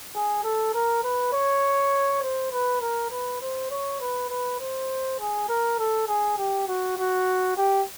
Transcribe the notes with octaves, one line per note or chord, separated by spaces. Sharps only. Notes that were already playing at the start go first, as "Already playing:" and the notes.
G#4
A4
A#4
B4
C#5
C5
B4
A#4
B4
C5
C#5
B4
B4
C5
G#4
A#4
A4
G#4
G4
F#4
F#4
G4